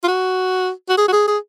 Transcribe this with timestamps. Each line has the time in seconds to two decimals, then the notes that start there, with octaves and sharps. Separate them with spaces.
0.03 F4
0.08 F#4
0.89 F#4
0.97 G#4
1.08 F#4
1.12 G#4
1.27 G#4